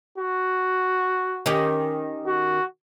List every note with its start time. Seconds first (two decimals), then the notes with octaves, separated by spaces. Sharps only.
0.18 F#4
1.46 D#3 C#4 G4
2.26 F#4